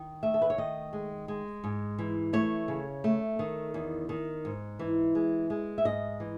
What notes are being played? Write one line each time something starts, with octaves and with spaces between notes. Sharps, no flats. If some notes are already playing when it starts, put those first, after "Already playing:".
Already playing: D#3
A3 E5
A4
B4
C#5
D#3 D#5
G#3
G#3
G#2
E3
A3 C#5
C#3
A3
D#3
E2
D#3
G#2
E3
G#3
G#3
E5
G#2 D#5
E3